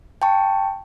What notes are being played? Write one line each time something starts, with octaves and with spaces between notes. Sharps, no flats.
G5 A5 C#6